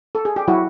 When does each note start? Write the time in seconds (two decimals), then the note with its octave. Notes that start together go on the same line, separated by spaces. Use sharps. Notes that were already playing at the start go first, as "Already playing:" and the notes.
0.15 A4
0.25 G#4
0.36 G4
0.48 F#3 E4 F#4